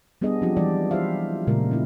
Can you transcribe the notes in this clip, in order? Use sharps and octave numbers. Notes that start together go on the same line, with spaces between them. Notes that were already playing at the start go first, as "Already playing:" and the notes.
G3 B3 D4 G#4 D#5
F3 F#3 C4 D4 F4 G4
E3 G3 D5
E4 G4 C5 E5 F5
A#2 C#3 G#3 A#4
C4 D4 E4